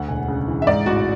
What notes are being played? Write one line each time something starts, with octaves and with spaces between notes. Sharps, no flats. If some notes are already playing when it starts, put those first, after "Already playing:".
Already playing: D2 F#5
E1 G#5
C#3
E3
E5
G#2 D5
A1 F#4